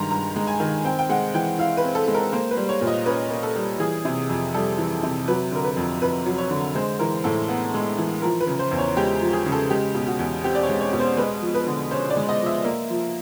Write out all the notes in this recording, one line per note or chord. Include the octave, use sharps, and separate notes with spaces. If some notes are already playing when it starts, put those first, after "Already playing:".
Already playing: G2 D#3 G#3 A#5 C6
G2 A#5
G#3
G#5
D#3
C4 G5
G5
G#3 F#5
E3 G5
E4 F5
B4
C4
A4
G#3
A#4
A#3 C5
B4
G3
C#5
A#2
D#5
C#4 B4
A#3
A4
G3
E3 G#4
C3
F2
G3 A4
E3
C3
F#3 B4
D3 A#4
B4
F2
F2 B4
F#3
C#5
D3
G#3 C5
E3 A#4
A2 A4
B3
G#3
E3
F3 A#4
B4
C#3
C5
E2
C#5
G#3 G4
F3
G#4
C#3
A4
G#3 G4
B2
F#4
E2
C4 G4
D5
C#5
G#3
C#5
B2
C5
G#3 B4
F3
B4
D3
C#4 C5
D5
G#3
D#5
F3
E5
A#3
F3